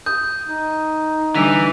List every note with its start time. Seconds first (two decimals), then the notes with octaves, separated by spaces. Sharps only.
0.06 D#6 G6
0.47 D#4
1.35 D3 E3 G3 D6 B6 D#7 F7